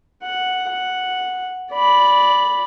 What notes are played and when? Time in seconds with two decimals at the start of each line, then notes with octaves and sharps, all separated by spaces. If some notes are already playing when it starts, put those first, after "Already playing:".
0.24 F#5
0.69 F#5
1.73 D5 B5